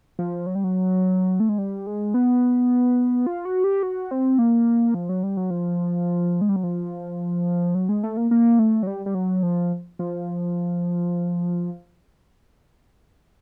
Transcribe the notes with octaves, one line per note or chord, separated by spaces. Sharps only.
F3
F#3
G3
F#3
A3
G#3
G3
G#3
B3
F4
F#4
G4
F#4
C4
A#3
F3
F#3
G3
F#3
F3
G#3
G3
F#3
F3
F#3
G#3
A3
A#3
A#3
A3
F#3
G3
G3
F#3
F3
F3